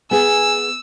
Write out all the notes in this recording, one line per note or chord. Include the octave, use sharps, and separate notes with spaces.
B3 G#4 G#5 E6